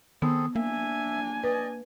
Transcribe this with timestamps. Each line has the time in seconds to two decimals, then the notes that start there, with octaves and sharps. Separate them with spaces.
0.22 D#3 B3 C4 G#4 A4
0.56 A#3 D4 E5 G#5
1.44 B4 D5 D#5